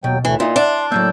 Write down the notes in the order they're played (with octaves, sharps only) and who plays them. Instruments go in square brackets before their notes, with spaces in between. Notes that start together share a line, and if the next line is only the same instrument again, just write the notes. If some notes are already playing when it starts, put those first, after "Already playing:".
[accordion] D#2 F#3 G5 [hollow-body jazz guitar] B2
[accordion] D2 A2 A3 [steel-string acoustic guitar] E3
[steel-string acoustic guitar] A#2 [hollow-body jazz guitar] D#4 E4 [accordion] C6
[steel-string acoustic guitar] D4 [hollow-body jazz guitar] D5 E5 F#5
[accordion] A2 E6 G6 [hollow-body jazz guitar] F#3 A3 A#3